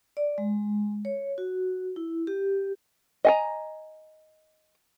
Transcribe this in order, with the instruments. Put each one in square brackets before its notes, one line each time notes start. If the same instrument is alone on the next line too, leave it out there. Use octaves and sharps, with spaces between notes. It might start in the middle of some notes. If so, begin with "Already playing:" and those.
[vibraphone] D5
G#3
C#5
F#4
E4
G4
[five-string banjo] D#5 G#5 A#5